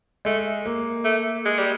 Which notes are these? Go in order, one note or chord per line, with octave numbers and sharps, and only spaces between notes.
G#3 A3
A#3
A3
G#3
G3